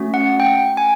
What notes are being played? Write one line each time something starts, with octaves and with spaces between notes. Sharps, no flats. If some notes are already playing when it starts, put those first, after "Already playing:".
Already playing: A3 C#4 F#4
F#5
G5
G#5